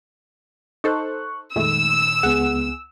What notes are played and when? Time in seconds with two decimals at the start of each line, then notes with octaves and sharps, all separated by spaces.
0.84 D#4 A4 C5 C#6 F#6
1.56 F2 A#2 D#3 G#3 A3 E6
2.23 C#2 B3 G#4 F#5